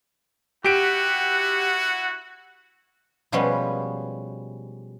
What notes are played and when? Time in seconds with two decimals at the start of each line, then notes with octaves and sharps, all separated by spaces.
0.64 E4 F#4 G4 F#5 D7
3.32 B2 F3 G3 G#3 B3 C#4